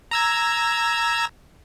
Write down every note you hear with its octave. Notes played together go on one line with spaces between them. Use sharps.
A#5 E6 G#6